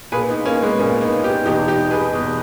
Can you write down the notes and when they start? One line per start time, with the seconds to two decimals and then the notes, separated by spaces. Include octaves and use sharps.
0.12 A#2 G#4 B4
0.29 B3 D#4
0.46 A#3 C#4
0.62 G#3 B3
0.79 A#2 A#3 C#4
1.01 B3 D#4
1.24 D#4 G4
1.46 E2 B2 D#4 G4
1.68 D#4 G4
1.91 G#4 B4
2.13 E2 B2